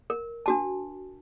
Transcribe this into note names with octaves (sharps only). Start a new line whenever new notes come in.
A#4
D4 F#4 A5